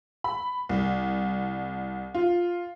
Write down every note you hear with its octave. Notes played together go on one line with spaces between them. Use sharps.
B5
C2
F4